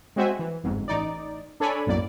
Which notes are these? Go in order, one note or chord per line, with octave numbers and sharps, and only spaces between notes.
G#3 C4 F#4 C5 E5 G#5
E3
G1 F2 G#2
A1 D#4 D5
D4 A4 C#5 D5 G#5 B5
B1 F#2 A2 A#3 D5